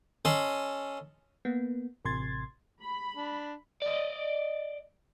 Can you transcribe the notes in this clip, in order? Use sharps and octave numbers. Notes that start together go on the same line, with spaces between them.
C#4 A4 D#5 G#5 B5 C6
A#3 B3
A1 C3 C6 G#6 A6
B5
D4
D5 D#5